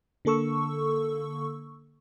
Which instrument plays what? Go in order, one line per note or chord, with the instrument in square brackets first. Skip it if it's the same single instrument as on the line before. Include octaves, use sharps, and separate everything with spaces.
[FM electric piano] D3 A#3 A4 C#6 E6